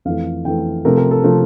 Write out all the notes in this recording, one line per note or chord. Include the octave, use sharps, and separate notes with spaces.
F2 E3 A3 F5
F2 E3 A3 G5
C3 F3 A3 A#4
A#4
A4
C3 F3 A3